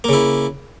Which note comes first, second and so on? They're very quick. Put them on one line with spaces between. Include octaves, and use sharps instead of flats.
A#3 C#3 E4